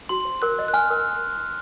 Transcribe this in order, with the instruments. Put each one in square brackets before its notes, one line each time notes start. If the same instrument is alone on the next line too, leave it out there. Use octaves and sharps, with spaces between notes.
[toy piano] F#4 [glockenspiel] C6
[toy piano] C5
[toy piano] A#4 [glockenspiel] F#6
[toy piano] D#5
[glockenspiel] F#6
[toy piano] G#5 [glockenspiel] F6
[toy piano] A#4